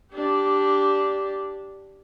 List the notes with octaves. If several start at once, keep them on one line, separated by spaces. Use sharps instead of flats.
D4 G4